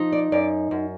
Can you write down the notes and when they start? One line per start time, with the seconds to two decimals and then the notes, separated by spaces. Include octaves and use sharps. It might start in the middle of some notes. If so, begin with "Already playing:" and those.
Already playing: F3 D#4
0.12 D5
0.32 F#2 D5
0.71 F#2